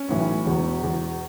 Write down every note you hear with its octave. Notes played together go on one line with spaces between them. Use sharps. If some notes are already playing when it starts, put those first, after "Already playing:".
Already playing: C#4
B1 A2 E3
E1 E2 B2
E1 E2 B2